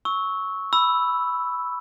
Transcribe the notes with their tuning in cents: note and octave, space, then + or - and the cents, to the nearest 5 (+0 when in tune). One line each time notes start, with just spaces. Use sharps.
C#6 +0 E6 -20
B5 +0 E6 +0